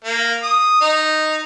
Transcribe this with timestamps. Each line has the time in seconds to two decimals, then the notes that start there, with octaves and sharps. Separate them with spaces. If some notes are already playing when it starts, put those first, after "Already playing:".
0.05 A#3
0.43 D#6
0.81 D#4